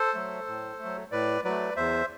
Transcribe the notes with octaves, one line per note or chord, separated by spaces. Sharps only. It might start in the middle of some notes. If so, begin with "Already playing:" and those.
Already playing: A4 C5
F#3 A3
A2
A3
F#3
A2 B4 D5
F#3 A3 B4 D5
E2 C5 E5